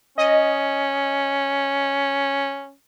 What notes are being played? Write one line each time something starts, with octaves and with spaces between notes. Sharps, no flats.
C#4 D#5